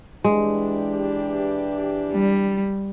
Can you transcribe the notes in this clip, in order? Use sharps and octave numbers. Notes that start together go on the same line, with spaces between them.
E3 G#3 D4 G4
G3